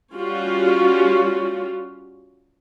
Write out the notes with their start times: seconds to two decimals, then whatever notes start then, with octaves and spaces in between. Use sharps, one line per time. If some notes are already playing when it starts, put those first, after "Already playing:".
0.14 G3 C#4 F4 F#4